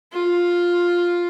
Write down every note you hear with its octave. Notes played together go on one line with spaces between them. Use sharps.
F4